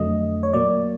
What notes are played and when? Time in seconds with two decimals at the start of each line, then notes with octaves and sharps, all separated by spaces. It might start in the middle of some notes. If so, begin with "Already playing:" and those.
Already playing: F2 D3 F#3 A3 D#5
0.43 C#5
0.53 A#2 F#3 A#3 D5